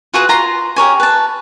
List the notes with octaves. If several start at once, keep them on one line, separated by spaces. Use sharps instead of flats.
F4 F#4 G#4 B4
F4 A#5 C6
G4 A#4 C#5 G#5
B4 A5